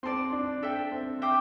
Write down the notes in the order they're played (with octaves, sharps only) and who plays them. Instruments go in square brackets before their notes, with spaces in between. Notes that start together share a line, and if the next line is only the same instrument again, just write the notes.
[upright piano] C4 [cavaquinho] D5 A5 C6
[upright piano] D4
[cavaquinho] A4 E5 G5
[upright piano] C4
[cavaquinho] C5 E5 G5 D6